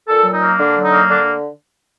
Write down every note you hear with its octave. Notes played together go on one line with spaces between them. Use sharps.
A#2 A4
F#3
D#4
A#3
D3 D4
F#3
D#4
A#3
D3 D4